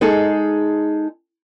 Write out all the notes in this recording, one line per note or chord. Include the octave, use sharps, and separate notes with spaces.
G#3 D#4 G#4 A4